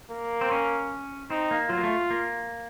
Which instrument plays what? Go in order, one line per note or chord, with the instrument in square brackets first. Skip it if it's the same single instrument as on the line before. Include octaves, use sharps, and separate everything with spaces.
[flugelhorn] A#3
[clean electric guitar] C4
C#4
[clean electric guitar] C4 [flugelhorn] D#4
[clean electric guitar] A#3
[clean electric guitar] F#3 [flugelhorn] F4
[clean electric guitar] A#3
A3
A#3